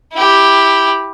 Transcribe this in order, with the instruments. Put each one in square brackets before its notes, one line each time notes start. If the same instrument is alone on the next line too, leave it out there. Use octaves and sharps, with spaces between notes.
[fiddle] E4 G4